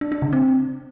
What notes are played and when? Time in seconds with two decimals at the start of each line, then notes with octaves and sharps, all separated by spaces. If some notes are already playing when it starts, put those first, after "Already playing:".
0.01 D4
0.12 D4
0.22 C#3
0.33 C4